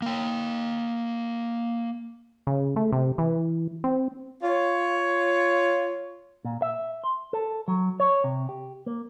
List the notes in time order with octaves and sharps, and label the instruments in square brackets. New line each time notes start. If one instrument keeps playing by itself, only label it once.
[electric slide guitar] A#3 G5
[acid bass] C#3
A3
C3
E3
C4
[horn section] F4 C#5
[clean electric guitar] A#2
E5
C6
A4
F#3
C#5
C3
G4
A#3